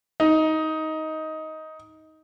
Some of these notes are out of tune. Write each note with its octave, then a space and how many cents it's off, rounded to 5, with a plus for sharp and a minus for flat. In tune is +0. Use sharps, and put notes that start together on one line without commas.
D#4 +15